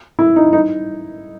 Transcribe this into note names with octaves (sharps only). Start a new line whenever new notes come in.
E4
D#4
D#4